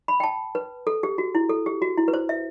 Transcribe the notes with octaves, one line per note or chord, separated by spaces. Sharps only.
B5
G5
A5
B4
A4
G4
F#4
E4
A4
G4
F#4
E4
B4
C5
E5